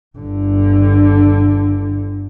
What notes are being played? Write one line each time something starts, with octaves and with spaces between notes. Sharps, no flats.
G1 D3